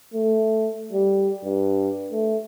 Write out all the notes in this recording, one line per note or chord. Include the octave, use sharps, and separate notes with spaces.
A3
G3
G2
A3